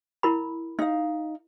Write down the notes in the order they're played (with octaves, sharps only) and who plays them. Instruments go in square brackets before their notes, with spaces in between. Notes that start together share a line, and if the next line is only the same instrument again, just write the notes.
[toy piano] E4 A#4 B5
[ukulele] D#4 F5